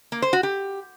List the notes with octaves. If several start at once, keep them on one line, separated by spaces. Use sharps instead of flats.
A#3
C5
F#4
G4